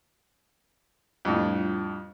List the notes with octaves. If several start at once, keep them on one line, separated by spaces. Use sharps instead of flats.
F2 A2 G3 D4 F4